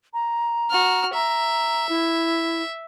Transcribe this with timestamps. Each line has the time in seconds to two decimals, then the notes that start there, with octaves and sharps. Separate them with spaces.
0.14 A#5
0.71 F#4 F6
1.14 E5 A#5
1.89 E4